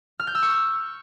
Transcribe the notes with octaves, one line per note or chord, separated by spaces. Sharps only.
F6
G6
E6
C#6